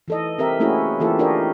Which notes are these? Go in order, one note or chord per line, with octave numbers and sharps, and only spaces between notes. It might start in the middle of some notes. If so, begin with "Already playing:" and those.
E3 A4 D#5
C4 G4 A#4 E5
A3 A#3 C#4 E4 F#4 G#4
E3 A#3 F4 G4 A4
D4 F4 G4 A#4 C#5 D#5